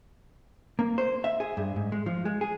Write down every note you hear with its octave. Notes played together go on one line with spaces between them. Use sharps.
A#3
C5
E5
G#4
G2
G#2
G#3
F3
G#3
G#4